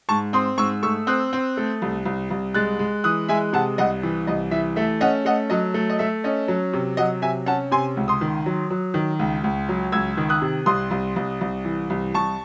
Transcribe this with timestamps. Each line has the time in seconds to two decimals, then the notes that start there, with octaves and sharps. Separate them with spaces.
0.09 G#2 A5 C#6
0.33 C4 C6 D#6
0.58 G#2 C#6 E6
0.83 A3 C#6 E6
1.07 C4 D#6 F#6
1.33 C4
1.57 A3
1.82 C2
2.05 C2
2.30 C2
2.54 G#3 F#6 A6
2.79 G#3
3.04 E3 D#6 F#6
3.28 G#3 E5 G#5
3.53 C3 F#5 A5
3.78 C2 D#5 F#5
4.03 E3
4.27 C2 D#5
4.51 E3 E5
4.76 A3 E5
5.01 C#4 D#5 F#5
5.25 A3 D#5 F#5
5.50 F#3 D#5
5.74 A3
5.90 D#5
5.99 A3 E5
6.24 C#4 D#5
6.48 F#3
6.73 C3
6.97 F#3 D#5 F#5
7.22 C3 E5 G#5
7.46 C#4 F#5 A5
7.71 C3 G#5 C6
7.97 C#2
8.08 C6 D#6
8.21 D#3
8.46 F#3
8.70 F#3
8.94 D#3
9.19 C#2
9.44 C#2
9.69 F#3
9.92 C#2 E6 G#6
10.17 D#3
10.29 D#6 F#6
10.42 C3
10.66 C2 C6 D#6
10.91 C2
11.16 C2
11.41 C2
11.65 E3
11.90 C2
12.14 C2 A5 C#6